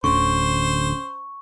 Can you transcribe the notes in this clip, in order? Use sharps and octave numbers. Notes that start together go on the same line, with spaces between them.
D1 D2 D3 C#4 C5 C#6